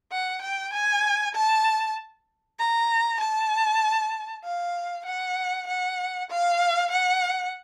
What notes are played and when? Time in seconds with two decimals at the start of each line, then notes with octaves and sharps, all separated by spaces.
0.12 F#5
0.42 G5
0.73 G#5
1.35 A5
2.59 A#5
3.20 A5
4.44 F5
5.06 F#5
5.67 F#5
6.30 F5
6.91 F#5